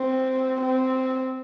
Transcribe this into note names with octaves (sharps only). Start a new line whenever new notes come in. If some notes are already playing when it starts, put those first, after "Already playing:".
Already playing: C4
C4